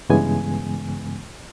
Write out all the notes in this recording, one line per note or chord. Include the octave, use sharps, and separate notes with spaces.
G2 C#3 E3 G#3 B3 G#5